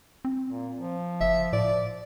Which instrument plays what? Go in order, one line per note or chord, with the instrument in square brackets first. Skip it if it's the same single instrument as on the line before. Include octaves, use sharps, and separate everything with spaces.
[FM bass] C4
[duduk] A#2
F3
[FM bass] F#1 [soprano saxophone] E5
[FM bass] A2 [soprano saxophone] D5